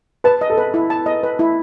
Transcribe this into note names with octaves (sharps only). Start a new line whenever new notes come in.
B4 A5
D#5
A4
B4
E4
A5
D#5
B4
E4